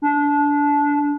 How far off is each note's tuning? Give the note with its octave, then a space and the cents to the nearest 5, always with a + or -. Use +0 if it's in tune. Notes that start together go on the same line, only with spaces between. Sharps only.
D4 -20